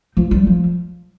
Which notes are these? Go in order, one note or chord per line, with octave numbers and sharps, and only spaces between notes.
F3
G3
F3